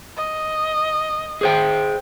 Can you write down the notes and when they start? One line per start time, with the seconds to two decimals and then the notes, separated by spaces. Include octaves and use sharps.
0.17 D#5
1.41 G#4 C5 G5